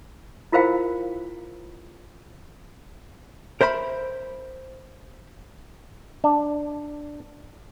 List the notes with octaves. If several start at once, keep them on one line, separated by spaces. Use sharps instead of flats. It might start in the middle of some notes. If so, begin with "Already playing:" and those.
E4 F4 A#4 C5 F5 G5
A#4 C5 E5 A#5 B5
D4